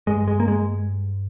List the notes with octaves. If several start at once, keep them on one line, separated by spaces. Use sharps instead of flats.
G2 G#3
G#3
A#3
G#3